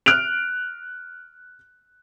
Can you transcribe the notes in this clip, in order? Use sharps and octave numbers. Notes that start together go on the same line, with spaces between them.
F6 F#6 D7 F7